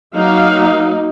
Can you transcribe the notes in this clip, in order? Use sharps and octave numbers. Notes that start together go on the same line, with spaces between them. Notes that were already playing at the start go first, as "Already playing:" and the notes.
F#3 A#3 D#4 F5